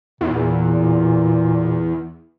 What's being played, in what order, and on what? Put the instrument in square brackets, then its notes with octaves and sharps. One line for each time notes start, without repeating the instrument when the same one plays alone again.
[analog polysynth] E2 [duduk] A#2